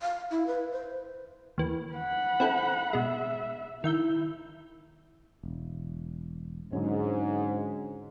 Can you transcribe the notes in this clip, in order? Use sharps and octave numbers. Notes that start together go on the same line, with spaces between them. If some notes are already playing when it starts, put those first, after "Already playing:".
F5
E4
B4
C5
D#2 E3
F#5 B5
C4 E4 A4
B2 G#3 E5
D#3 E4 E5 G6
E1
G#2 D3 F#3 C#4